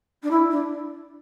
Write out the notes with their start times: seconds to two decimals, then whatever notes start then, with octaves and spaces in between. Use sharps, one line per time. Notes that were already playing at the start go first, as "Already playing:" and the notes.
0.22 D4
0.30 E4
0.50 D4